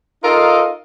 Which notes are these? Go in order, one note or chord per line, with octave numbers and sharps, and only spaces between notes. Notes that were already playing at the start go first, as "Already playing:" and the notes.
D#4 F4 A4 A#4 D#5 F5